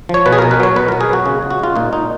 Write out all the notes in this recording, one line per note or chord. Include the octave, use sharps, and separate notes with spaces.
F3 C#5
B2 B4
G#4
B2 A#4
B4
F#3 C#5
B2 B4
B2 A#4
G#4
F#3 F#4
C#3
C#3
F#4
G#3 F4
A#2 D#4
A#2 D#4